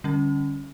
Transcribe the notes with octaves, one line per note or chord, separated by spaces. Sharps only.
D3 G3 C#4